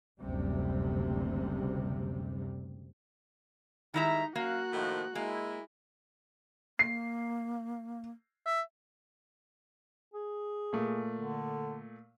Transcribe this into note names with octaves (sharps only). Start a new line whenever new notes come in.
F#1 D2 C3 G3
D#3 G3 G#3 D#4 E4 E5 A#5
F#2 A#3 F#4 F5 F#6
A2 D#3 F3
G#3 A#3 E4
A#3 C7
E5
G#4
A#2 A3
D3